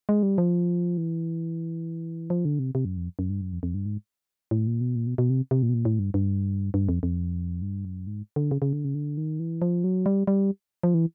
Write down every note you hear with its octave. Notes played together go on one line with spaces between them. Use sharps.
G#3
G3
F3
E3
F3
D3
C3
C3
F#2
F2
F#2
G2
F#2
F2
F2
G2
G#2
A2
A#2
B2
A#2
B2
B2
C3
C3
A#2
B2
A#2
A2
G2
G2
G2
F2
F2
G2
F#2
G#2
D3
C#3
C#3
D3
C#3
D3
D#3
E3
F3
F#3
G3
G3
F3
E3